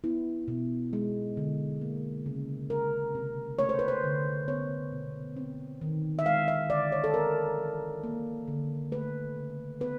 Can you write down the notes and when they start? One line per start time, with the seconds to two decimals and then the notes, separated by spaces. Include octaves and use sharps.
0.04 B3 E4
0.48 B2
0.93 G#3
1.37 D3
1.81 A#3
2.26 C#3
2.70 G#3 A#4
3.15 C3
3.59 A3 C#5
3.69 C5
3.79 B4
3.88 C5
4.03 D3
4.48 B3 C#5
4.92 B2
5.37 C4
5.81 D#3
6.19 E5
6.26 G#3 F5
6.48 E5
6.70 D3 D5
6.92 C#5
7.04 A4
7.14 C4 A#4
7.58 E3
8.04 A#3
8.48 D3
8.92 A3 B4
9.36 C#3
9.81 B3 B4